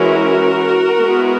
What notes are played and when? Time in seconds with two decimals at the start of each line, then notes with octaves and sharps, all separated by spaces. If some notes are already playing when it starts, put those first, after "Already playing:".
Already playing: E3 G#3 C#4 E4 F#4 A#4
0.99 G#3 B3 E4